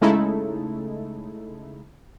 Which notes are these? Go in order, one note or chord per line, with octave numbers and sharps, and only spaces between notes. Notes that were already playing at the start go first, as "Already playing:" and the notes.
C#3 G#3 A3 D#4 E4 A4